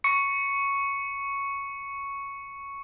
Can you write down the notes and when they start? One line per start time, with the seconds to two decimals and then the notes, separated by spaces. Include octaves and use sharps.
0.04 C#6 C#7